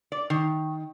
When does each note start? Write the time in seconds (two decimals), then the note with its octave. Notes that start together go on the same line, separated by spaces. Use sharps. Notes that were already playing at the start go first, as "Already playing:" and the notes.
0.12 D5
0.30 D#3